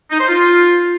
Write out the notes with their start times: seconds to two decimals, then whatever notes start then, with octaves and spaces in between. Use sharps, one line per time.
0.11 D#4
0.20 C5
0.28 F4